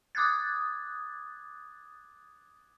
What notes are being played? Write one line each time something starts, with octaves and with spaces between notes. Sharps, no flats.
D6 D#6 F#6 G#6 A6